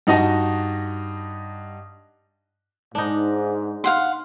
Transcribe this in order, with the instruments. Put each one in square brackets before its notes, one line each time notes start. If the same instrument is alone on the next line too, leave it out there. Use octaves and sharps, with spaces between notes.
[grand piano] G2 D#4 F#4 D#5 A5
[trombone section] G#2 [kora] D4 D#4
[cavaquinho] F5 F#5 C6